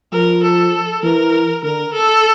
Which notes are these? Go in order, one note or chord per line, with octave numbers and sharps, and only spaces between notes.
F3 A#4
A4
E3 A#4
D3 A#4
A4